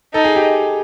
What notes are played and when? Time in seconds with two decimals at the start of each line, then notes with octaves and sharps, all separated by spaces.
0.14 D#4 A4
0.24 G#4
0.35 G4